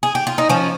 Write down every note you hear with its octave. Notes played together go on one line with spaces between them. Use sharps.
G#4
G4
F4
D#4
F3 C#4